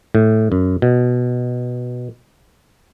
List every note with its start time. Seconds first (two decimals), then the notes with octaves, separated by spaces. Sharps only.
0.15 A2
0.52 F#2
0.82 B2